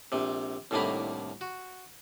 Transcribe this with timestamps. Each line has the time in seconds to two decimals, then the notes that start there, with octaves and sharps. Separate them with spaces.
0.12 A#1 C3
0.71 C2 A2 D3 D#3 A#3 B5
1.41 F#4